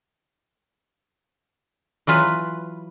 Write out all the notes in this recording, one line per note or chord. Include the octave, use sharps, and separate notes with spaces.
E3 F#3 F4 B4